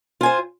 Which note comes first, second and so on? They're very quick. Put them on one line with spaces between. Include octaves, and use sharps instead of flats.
F4 G#5 C5